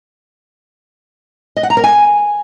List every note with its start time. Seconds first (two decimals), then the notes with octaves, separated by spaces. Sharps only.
1.57 D#5
1.63 F#5
1.70 A#5
1.77 A#4
1.84 G#5